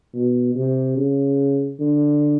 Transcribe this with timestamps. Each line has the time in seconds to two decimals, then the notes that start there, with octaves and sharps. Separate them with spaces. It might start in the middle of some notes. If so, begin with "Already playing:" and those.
0.14 B2
0.55 C3
0.97 C#3
1.80 D3